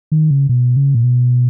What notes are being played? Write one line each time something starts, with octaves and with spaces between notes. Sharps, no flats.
D#3
C#3
B2
C#3
A#2
B2